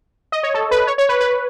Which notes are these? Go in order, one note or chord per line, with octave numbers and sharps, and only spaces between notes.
D#5
C#5
A4
B4
C#5
C#5
B4
B4